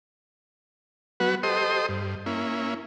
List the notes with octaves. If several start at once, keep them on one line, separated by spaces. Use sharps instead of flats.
F#3 B3 F#4 B4
G4 A4 C5 D#5 C6 D#6
G2
A#3 C#4 E4